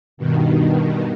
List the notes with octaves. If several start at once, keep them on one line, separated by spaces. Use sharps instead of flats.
G2 B2 D#3